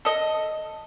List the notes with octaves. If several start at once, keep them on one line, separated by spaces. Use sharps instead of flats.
A4 D#5